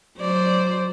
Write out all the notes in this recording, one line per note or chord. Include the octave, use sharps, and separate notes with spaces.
F#3 C5 D5